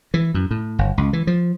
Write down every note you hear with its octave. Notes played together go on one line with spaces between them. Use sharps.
E3
F#2
A2
G1
C#2
E3
F3